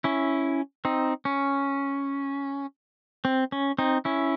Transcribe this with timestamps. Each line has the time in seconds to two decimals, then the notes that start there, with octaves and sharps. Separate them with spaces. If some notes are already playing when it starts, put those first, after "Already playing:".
0.04 C#4 E4
0.85 C4 D#4
1.25 C#4
3.25 C4
3.52 C#4
3.78 C4 D#4
4.05 C#4 E4